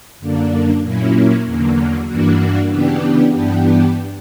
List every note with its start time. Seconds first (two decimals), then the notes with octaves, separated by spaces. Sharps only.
0.20 F#2 D3 A#3 D4
0.82 A#2 F#3 A#3 C#4 E4
1.44 E2 D3 F#3 A#3
2.07 G2 E3 A#3 D4 F#4
2.70 C#3 E3 B3 D4 G4
3.32 G2 E3 B3 D4 G4